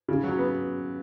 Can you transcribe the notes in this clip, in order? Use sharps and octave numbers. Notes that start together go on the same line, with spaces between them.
C#3
F#3
B3